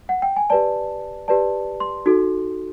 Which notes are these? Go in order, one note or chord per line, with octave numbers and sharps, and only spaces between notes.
F#5
G5
G#5
G4 B4 D5 A5
G4 B4 D5 A5
C6
D#4 F#4 A4